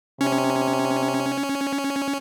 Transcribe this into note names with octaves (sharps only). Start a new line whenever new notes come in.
C3 C#4